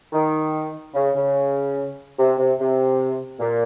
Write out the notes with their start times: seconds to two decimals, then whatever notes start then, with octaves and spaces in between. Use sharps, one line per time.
0.13 D#3
0.94 C#3
1.15 C#3
2.18 C3
2.38 C3
2.59 C3
3.40 A#2